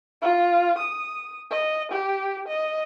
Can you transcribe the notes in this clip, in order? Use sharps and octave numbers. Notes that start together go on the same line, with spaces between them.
F4
D#6
D#5
G4
D#5